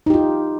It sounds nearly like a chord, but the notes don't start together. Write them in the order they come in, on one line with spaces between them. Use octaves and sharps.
D#4 G4 F4